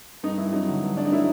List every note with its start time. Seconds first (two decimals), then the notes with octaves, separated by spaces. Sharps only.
0.23 G2 D#4
0.38 G2 E4
0.53 F#3 D#4
0.67 D3
0.83 G2
0.97 G2 D4
1.05 D#4
1.12 F#3 E4